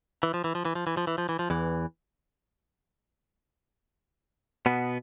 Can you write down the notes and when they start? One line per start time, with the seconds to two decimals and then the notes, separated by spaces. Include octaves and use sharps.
0.23 E3
0.34 F3
0.44 E3
0.55 F3
0.65 E3
0.75 F3
0.87 E3
0.97 F3
1.07 E3
1.18 F3
1.29 E3
1.39 F3
1.50 E2 E3
4.66 B2 B3